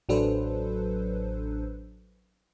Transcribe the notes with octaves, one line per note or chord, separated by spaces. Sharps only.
A1 F#3 D4 A4 B4 C5